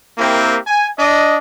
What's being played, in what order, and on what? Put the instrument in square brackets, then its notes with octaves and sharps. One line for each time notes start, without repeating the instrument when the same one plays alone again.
[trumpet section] A#3 C4 E4 G4 A#4
G#5
D4 D#5